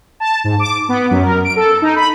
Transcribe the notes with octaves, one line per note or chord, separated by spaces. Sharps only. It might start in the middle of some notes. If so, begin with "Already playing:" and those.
A5
G#2
D6
B3
F#2
A#4
D7
A4
D#4
B5